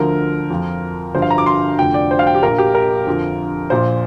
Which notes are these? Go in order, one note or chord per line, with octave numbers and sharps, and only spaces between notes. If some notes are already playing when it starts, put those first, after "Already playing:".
Already playing: D2 D3 F3 A#4
F2 F3
G1 G2 F3 C5
F5
A#5
D6
C6
F1 F2 D3 F3 G5
D5
C5
F5
G5
G4
A#1 A#2 F3 A#4
G4
A#4
F2 D3 F3
A#1 A#2 F3 C5